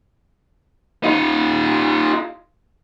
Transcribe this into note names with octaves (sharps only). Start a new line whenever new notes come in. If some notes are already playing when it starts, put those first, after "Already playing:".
D#4 F4